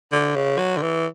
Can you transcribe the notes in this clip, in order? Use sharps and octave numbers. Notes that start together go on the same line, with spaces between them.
D3
C#3
F#3
D3
E3